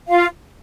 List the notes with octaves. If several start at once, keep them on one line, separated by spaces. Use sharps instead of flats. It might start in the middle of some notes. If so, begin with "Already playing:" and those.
F4 F5